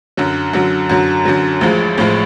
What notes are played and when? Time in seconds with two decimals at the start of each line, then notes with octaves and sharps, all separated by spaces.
0.17 F#2 D3 F#3
0.53 F#2 D3 F#3
0.89 F#2 D3 F#3
1.25 F#2 D3 F#3
1.61 A1 A2 F3 G#3
1.98 A1 A2 F3 G#3